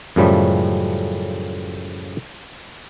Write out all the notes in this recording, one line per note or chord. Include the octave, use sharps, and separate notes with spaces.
F#2 A2 C#3 F3 G3 A3